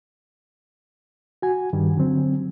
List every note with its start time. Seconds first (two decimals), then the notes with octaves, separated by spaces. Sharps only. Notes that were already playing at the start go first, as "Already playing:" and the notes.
1.42 F#4 G#5
1.73 G2 D#3 G3
1.95 D3 F#3 C4